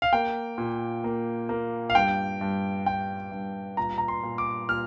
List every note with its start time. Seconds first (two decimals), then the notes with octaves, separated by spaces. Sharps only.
0.02 F5
0.12 A#3 G5
0.58 A#2
1.04 A#3
1.49 A#3
1.90 F5
1.95 G2 G5
2.41 G2
2.86 G2 G5
3.32 G2
3.77 A#2 A#5
3.98 A#5
4.08 C6
4.23 A#2
4.38 D6
4.69 A#2 F6